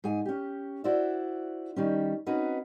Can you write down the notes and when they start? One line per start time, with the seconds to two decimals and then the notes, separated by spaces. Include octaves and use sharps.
0.04 G#2 G#4 G#5
0.26 C#4 G4
0.84 E4 F#4 C5 D5 E5
1.76 D#3 G3 C#4
2.26 C4 C#4 D#4 F#4 B4